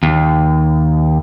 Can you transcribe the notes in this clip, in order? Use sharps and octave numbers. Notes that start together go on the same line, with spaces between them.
D#2